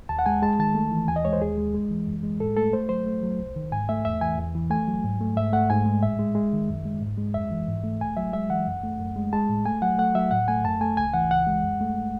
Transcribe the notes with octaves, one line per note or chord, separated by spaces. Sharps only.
D#2 A5
F#5
G#3 G#5
G#3 A5
D#3 A5
A3
E3
D#2 G#5
D#5
G#3 C#5
C5
D#2 G#4
G#3
G#3
E3
F#2
G#3
A2 A4
A3 A4
A3 C5
F#3 C5
A3
F#3
C2
D#3
G#2 G#5
A3 E5
E2 E5
E3 G#5
E2
E3
A3 G#5
F#3
G#2
A3
G#2 E5
A3 F#5
G#2 G#5
G#3
A2 E5
G#3
G#3
D#3
F#2
G#3
G#2
G#3
F#2 E5
E3
G#2
A3
C2 G#5
F#3 E5
G#3 E5
E3 F#5
F#2
A3
F#2
G#3
G#3 A5
A2
A3 G#5
F#3 F#5
A3 F#5
F#3 E5
A2 F#5
A3 G#5
F#2 A5
A3 G#5
C#2 G#5
E3 F#5
C#2 F#5
G#3
F#2
A3